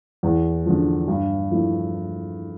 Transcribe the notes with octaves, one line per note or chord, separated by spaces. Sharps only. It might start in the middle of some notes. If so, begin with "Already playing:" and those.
E2
D3 F3
G2
F3 A3 E4